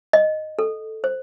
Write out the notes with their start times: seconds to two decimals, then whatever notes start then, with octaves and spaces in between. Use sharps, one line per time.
0.13 D#5
0.59 A4
1.04 C5